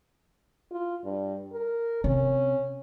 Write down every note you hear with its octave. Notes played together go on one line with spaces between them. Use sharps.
F4
G2
A#4
C3 C#4